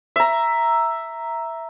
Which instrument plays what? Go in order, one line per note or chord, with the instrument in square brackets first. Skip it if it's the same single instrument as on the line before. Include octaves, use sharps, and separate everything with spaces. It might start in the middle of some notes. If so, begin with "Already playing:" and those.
[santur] E5 A#5